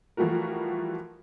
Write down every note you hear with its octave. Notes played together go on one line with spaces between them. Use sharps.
E3 F3 G3 A3 F#4 A#4